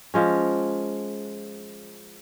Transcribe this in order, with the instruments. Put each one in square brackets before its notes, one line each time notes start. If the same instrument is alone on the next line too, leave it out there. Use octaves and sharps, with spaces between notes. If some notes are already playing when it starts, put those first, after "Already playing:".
[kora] F3 G#3 C#4